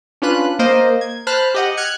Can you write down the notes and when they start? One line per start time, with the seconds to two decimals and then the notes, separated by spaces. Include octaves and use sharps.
0.22 C#4 D4 F4 B4 F#6
0.59 A#3 A#4 C5 D#5
1.01 G#6
1.27 C5 A5 B5 F6 F#6
1.54 G4 D#5 F#5
1.77 F6 F#6 G#6 C#7